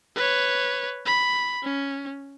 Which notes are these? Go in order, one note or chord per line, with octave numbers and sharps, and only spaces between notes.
B4 C#5
B5
C#4